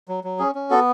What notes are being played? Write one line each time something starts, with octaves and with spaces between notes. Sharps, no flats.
F#3
F#3
C#4 G#4
C#4
B3 F#4 A4